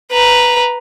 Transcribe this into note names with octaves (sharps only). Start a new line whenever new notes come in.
B4 A#5